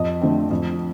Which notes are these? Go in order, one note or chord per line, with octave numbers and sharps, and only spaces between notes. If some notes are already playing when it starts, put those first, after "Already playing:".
Already playing: F2 D#5
D3 A3 C4
F2